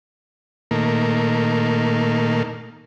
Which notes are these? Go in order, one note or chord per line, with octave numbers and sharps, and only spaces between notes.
A#2 D#3 A3 A#3